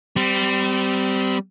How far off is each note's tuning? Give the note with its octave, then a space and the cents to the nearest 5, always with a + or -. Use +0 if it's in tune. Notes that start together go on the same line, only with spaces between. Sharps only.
G3 -10 C4 -30